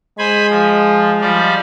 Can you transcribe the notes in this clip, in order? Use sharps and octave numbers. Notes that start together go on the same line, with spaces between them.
G#3 C5 G#5 B5
F3
F3 G3 D5